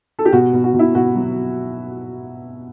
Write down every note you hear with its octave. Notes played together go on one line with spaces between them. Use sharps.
A4
G4
B2 F#4
B2
F#4
B2
E4
B2 F#4
F#3